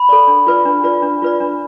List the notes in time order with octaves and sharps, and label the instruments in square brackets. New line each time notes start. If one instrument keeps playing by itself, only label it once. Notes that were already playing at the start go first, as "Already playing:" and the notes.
Already playing: [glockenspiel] B5
[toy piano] A4 D5
D4
F4 B4 D5
D4
F4 B4 D5
D4
F4 B4 D5
D4